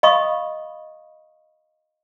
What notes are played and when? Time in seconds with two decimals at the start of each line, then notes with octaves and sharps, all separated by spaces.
0.03 D#5 F5 B5 C#6 D#6